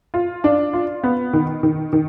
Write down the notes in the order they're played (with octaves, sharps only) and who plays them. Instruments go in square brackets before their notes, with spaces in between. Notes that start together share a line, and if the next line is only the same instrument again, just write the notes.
[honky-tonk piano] F4
D4
F4
B3
D#3
D#3
D#3